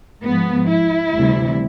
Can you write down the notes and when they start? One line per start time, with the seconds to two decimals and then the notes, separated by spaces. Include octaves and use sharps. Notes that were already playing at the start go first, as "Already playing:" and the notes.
0.23 G#2 F3 B3
0.69 E4
1.14 D2 C3 E3 G3